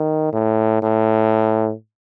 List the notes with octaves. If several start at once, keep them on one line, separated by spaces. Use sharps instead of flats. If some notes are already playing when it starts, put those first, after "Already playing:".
Already playing: D#3
A2
A2